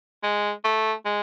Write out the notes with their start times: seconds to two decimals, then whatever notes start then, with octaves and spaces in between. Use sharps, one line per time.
0.23 G#3
0.64 A3
1.05 G#3